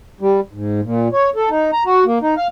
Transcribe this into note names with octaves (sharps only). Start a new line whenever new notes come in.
G3
G#2
A#2
C#5
A4
D#4
A#5
F#4
A#3
D#4
F5